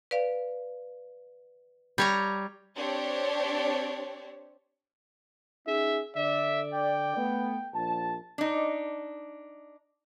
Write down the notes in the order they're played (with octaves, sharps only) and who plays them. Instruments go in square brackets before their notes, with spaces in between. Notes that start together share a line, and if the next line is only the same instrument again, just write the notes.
[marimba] B4 D5 F5
[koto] G3 C#5 A#5
[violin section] C4 D4 G4 C#5
[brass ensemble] C#4 D#4 G#4 [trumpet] E5
[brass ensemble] D3 D5 [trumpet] E5
[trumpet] G5
[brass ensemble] A3 B3
A#1 A5
[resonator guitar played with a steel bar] D4 D#4